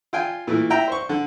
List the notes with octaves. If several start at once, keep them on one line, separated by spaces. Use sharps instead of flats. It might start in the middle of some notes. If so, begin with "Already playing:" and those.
F4 G5 G#5
A#2 E3 A3
E4 G5 A#5
C5 C#6
D3